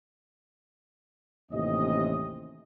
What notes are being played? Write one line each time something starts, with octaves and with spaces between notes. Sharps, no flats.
A1 D#2 C3 C#4 D#5